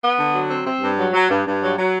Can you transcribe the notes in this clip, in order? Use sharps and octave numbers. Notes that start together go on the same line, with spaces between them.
B3
D3
F#3
C4
C4
G2
F#3
F#3
G2
G2
F#3
F#3